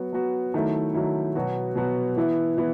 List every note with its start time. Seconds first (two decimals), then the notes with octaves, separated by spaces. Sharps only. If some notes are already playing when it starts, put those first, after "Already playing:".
Already playing: F#3 B3 F#4
0.13 F#3 B3 F#4
0.54 D#3 F#3 A3 E4
0.94 D#3 F#3 A3 E4
1.35 B2 F#3 B3 F#4
1.76 B2 F#3 B3 F#4
2.17 E3 B3 E4
2.58 E3 B3 E4